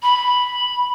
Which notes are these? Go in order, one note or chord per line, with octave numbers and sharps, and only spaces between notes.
B5